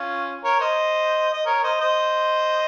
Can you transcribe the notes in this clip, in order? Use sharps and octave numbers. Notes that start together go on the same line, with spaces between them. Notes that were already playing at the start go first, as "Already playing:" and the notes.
Already playing: C#4 F4
A#4 C#5
C5 D#5
D#5
A#4 C#5
C5 D#5
C5 D#5